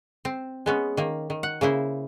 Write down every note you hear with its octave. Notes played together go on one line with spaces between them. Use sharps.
C4
G#3 B3 C#4
D#3 A#3
D#3
F#5
C#3 A#3 E4 C5